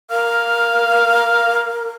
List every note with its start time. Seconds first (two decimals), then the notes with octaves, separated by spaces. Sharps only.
0.11 A#4 F5